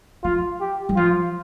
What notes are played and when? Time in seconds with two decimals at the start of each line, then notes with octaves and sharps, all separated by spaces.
0.24 F3 F4
0.61 G4
0.89 G3
0.97 F3 F4